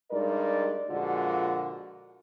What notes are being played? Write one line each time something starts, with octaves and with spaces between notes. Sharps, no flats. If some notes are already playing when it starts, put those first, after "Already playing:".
G2 G#3 D#4 A#4 D5
A#2 D3 F3 G#3 F4 F#4